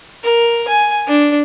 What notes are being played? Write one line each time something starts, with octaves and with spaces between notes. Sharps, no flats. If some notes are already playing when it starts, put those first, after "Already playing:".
A#4
G#5
D4